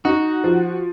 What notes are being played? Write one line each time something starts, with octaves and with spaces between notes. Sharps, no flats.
D#4 F#4
F3